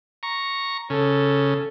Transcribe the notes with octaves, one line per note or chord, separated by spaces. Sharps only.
A#5 C#6
C#3 A4